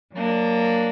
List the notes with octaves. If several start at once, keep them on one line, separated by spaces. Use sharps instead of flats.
F#3 A#3 D4